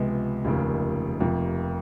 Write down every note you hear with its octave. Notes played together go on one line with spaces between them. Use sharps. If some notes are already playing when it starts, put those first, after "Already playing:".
Already playing: C#2 C3 F3 G#3 B3
F1 D#2 C#3 F3 A#3
F1 F2 C3 F3 A#3